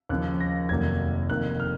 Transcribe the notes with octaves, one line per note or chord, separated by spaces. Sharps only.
D#2 C#3 F3 F#6
A#6
F1 D#2 D#3 F#3 A#3 G#6
F1 F2 D#3 A#3 F#6
F6